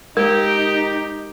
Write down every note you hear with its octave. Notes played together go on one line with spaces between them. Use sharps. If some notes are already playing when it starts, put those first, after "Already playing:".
G#3 D#4 G4 A#4